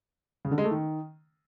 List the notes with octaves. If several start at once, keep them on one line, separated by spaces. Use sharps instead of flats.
C#3
D3
G#3
A3
D#3